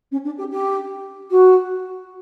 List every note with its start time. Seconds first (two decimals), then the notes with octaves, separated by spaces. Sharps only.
0.11 C#4
0.24 D4
0.38 G4
0.51 G4
1.30 F#4